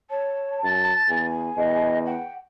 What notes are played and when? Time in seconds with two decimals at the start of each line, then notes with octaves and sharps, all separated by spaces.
0.10 C#5 A5
0.64 F#2 A6
1.09 E2 G#5
1.57 E2 D#5
2.06 F#5 G5